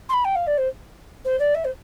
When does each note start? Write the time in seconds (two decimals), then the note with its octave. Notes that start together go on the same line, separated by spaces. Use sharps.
0.09 C6
0.13 B5
0.24 G5
0.35 F5
0.47 D5
0.57 C5
1.24 C5
1.39 D5
1.54 E5
1.64 C5